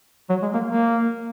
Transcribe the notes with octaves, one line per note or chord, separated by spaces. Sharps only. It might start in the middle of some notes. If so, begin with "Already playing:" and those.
F#3
G#3
A#3
A#3